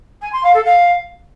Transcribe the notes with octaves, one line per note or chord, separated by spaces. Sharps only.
G#5
C6
F5
A4
F5